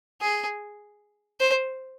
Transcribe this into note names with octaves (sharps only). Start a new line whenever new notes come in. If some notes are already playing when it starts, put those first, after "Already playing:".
G#4
C5